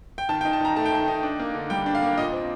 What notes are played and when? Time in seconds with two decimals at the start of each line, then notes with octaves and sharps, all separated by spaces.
0.18 G5
0.29 D#3 A5
0.41 G5
0.45 D#4
0.53 A5
0.61 D#3 A#5
0.76 A3 A5
0.85 G5
0.92 D#3 A5
1.08 D#4
1.23 D4
1.40 A#3
1.55 D3
1.70 G3 G5
1.86 D4
1.95 F5
2.02 A#3
2.18 A#2 D#5
2.33 C4